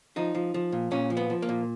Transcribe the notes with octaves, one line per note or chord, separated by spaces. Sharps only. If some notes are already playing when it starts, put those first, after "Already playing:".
F3 D#4
F3
F3
A#2
A#2 C#4
F3
B3
F3
A#3
A#2